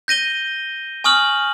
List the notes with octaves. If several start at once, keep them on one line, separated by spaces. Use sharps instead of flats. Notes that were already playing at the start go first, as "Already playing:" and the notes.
G6 A#6 D#7 G7
G#5 C#6 D#6 F6 F#7